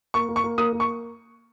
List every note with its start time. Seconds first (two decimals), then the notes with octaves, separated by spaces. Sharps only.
0.14 A#3 C#6
0.29 A#3
0.36 C#6
0.44 A#3
0.58 A#3 D#6
0.73 A#3
0.80 C#6